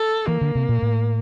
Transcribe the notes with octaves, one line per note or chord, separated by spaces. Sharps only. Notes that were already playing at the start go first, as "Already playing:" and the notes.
Already playing: A4
E3 A#3
D3
C3
A#2
A2